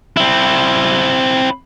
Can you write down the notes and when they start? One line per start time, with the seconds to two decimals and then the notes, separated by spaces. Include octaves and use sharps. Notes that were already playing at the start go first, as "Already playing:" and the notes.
0.17 C4 E4